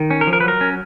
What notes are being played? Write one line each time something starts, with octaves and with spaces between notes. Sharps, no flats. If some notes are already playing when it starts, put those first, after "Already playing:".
Already playing: D#3
C#4
A#4
F3
A#4
B4
F#3 A#4
C#4